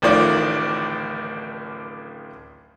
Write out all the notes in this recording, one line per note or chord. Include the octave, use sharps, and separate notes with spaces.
D1 A1 A2 D#3 F3 D5